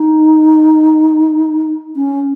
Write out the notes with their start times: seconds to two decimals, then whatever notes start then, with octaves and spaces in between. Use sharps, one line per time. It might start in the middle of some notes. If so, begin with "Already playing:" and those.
Already playing: D#4
1.96 C#4